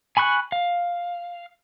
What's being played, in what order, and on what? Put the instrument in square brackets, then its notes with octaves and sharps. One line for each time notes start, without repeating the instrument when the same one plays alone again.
[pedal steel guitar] G#5 B5 C#6 F#6
F5